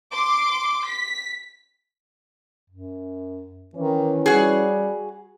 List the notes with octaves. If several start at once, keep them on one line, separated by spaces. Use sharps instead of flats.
C6 D6
B6
F#2
D#3 E3 C#4
G3 F#4 G#4